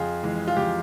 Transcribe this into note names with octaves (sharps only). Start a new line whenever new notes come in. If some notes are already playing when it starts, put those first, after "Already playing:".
Already playing: F2 F4 G#4
E3 G#3
F4
F2 G4